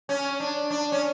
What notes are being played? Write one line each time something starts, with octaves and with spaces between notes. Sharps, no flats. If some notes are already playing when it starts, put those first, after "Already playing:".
C#4
D4
D4
C#4